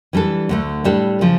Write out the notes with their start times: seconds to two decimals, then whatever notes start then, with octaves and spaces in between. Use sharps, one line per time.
0.13 E3 G3 D4 A4
0.49 D2 D3 A3
0.84 A2 G3 D4 A4
1.21 C#3 F3